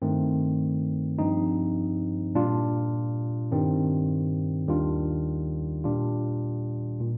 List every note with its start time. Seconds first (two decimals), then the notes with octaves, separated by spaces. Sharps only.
0.02 G2 D#3 A3 C4
1.18 G2 F3 C4 D#4
2.35 A#2 G3 D4 F4
3.51 G2 D#3 G3 C4
4.67 D#2 D#3 G3 D4 F4
5.84 A#2 G3 D4 F4
7.00 A#2